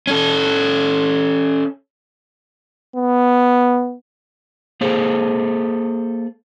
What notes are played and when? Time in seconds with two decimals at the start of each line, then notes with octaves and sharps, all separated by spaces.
0.07 C#4 A4
2.96 B3
4.81 A#3 G#4 A4 C5